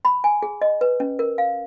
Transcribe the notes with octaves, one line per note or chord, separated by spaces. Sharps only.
B5
G#5
G#4
D#5
B4
C#4
A#4
F5